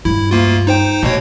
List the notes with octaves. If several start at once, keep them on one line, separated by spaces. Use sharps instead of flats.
G2 E4
D2 A#3 F4
D#4 C5 G5
D#2 B2 A3 C#5